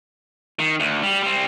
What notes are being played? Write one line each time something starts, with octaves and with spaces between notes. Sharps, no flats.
D#3
D2
G3
G3 C4